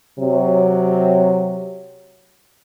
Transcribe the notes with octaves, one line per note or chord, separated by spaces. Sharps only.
C3 F#3